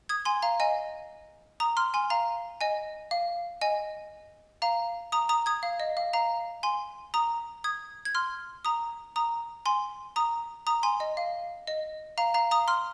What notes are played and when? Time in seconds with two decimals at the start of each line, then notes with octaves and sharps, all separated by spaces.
0.09 D#6 G#6
0.25 G#5 C6
0.42 F5 A#5
0.60 D#5 G#5
1.60 A#5 D#6
1.77 C6 F6
1.94 G#5 C6
2.10 F5 A#5
2.61 D#5 G#5
3.11 F5
3.61 D#5 G#5
4.62 F5 A#5
5.12 A#5 D#6
5.29 A#5 D#6
5.46 D#6 G#6
5.63 F5
5.80 D#5
5.97 F5
6.13 F5 A#5
6.63 G#5 C6
7.14 A#5 D#6
7.64 D#6 G#6
8.05 G#6
8.15 C6 F6
8.65 A#5 D#6
9.16 A#5 D#6
9.66 G#5 C6
10.16 A#5 D#6
10.67 A#5 D#6
10.83 G#5 C6
11.00 D#5
11.17 F5
11.67 D#5
12.18 F5 A#5
12.34 F5 A#5
12.51 A#5 D#6
12.68 C6 F6